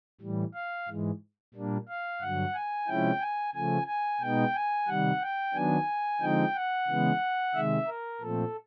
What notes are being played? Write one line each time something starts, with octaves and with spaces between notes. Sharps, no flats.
A2 E3 G3
F5
G#2 E3 G#3
A#2 G3 A#3 D4
F5
G2 D3 F#3 F#5
G#5
C3 F3 G#3 C#4 E4 G5
G#5
C#3 F3 A3 G#5
G#5
B2 G#3 B3 D#4 G5
G#5
C3 D#3 G3 F#5
G5
D#3 F#3 B3 D4 G#5
D3 F3 G#3 C4 D#4 G5
F#5
C#3 E3 G#3 B3
C3 D#3 G#3 E5
A#4
A#2 F3 A3 C4 A4